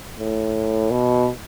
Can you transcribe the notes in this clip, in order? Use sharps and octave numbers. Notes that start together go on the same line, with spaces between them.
A2
B2